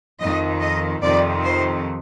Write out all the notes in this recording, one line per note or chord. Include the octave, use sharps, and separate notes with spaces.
F2 D#3 D#5
D#5
F2 C3 D#3 D5
C5